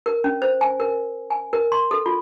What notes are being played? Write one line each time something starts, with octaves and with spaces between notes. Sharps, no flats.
A#4
C#4
C5
G#5
A#4
G#5
A#4
C6
A4
F4